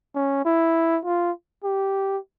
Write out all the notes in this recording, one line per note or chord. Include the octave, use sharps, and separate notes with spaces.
C#4
E4
F4
G4